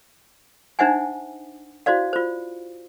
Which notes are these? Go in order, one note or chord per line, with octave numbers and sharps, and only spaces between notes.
D4 D#4 C5 E5 F#5 G#5
E4 F#4 C5 D5 F5
F4 C5